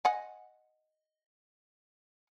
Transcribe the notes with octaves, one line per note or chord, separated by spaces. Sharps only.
D#5 F#5 G#5